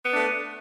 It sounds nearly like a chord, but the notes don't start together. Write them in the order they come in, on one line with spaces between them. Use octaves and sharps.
B3 D4 A3